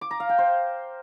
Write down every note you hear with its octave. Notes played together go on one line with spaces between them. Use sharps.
D6
A#5
F5
G5
C5